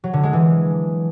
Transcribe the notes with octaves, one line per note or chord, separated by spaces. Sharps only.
F#3
D3
G#3
E3